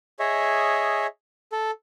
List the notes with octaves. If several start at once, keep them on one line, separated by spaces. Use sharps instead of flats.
G#4 C#5 D#5 E5
A4